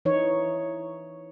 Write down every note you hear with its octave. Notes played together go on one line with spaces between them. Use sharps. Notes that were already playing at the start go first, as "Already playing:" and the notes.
E3 D#4 C#5